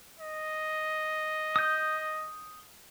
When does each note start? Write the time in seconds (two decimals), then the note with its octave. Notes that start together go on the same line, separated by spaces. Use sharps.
0.19 D#5
1.56 D#6 G6